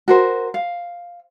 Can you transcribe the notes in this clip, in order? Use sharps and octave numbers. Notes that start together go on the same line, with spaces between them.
F#4 A#4 C5
F5